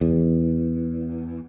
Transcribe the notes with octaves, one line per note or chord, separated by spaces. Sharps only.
E2